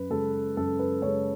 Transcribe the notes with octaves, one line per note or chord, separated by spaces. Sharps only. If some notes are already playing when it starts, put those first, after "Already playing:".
Already playing: F#2 B4
C#3 G#3 A4
F#2 A4
B4
C#3 G#3 C#5